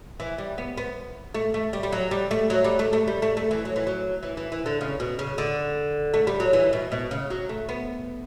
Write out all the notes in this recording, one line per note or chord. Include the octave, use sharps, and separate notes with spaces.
E3
G3
B3
B3
A3
A3
G3
G3
F#3
G3
A3
F#3
G3
A3
A3
G3
A3
A3
E3
F#3
E3
F#3
E3
E3
E3
D3
C#3
B2
C#3
D3
A3
G3
F#3
E3
B2
B2
C#3
F#3
A3
B3